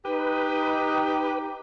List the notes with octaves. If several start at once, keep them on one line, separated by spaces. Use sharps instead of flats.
D#4 G4 B4